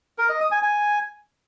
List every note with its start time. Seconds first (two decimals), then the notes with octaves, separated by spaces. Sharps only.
0.18 A#4
0.29 D#5
0.40 D#6
0.51 G#5
0.62 G#5